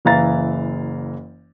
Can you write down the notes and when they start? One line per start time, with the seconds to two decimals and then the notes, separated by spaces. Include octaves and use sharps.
0.05 F#1 E3 F5 A#5 A6